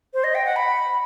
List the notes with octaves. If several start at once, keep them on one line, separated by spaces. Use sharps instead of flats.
C5
D#5
G5
F#5
B5